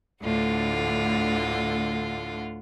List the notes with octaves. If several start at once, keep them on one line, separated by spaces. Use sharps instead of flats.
D2 A2 D3 F4 F#5